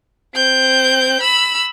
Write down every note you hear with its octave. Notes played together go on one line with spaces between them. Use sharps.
C4 G6
B5 E6